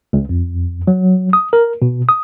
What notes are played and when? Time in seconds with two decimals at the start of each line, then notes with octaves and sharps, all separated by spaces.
0.13 C#2
0.29 F2
0.87 F#3
1.33 D#6
1.53 A#4
1.82 B2
2.09 D#6